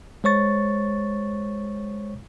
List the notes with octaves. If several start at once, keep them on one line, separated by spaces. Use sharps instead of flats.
G#3 C5 C#5 C#6 A6